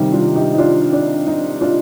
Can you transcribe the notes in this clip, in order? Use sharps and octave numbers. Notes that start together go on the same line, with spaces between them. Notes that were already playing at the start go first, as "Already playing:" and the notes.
Already playing: C3 D#3 G3 D#4 G4
D4 F4
D#4 G4
D#4
D4 F4
D4
D#4
D4 F4